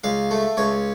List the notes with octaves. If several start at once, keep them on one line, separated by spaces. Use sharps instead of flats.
C#2 F5
A3
C#2 C#5